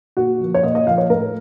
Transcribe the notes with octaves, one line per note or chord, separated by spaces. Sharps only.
A#2 F#4
F3 A#3
C#5
A#2 D#5
D#5
F3 A#3 F5
C#5
A2 A#4